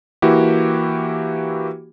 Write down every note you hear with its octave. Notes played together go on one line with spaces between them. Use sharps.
E3 A#3 E4 F#4 G4